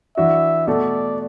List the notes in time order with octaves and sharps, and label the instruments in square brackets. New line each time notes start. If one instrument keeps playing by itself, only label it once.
[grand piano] E3 D4 F#4 [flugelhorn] E5
[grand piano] B2 A3 F#4 A4 [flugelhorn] D5